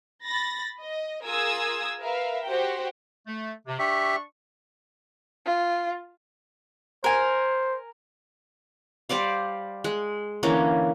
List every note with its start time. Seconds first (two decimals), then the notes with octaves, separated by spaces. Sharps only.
0.25 B5 A6 A#6
0.81 D#5
1.24 F4 G#4 A#4 D#6 E6 G#6
2.00 A#4 B4 E5 F5
2.45 F#4 G4 C5 G5
3.27 A3
3.67 C3
3.79 D4 G4 E5 C#6
5.46 F4
7.04 A#4 C5 G#5
9.09 G3 C5 D5 F5
9.84 G#3
10.43 D3 E3 A#3 C#4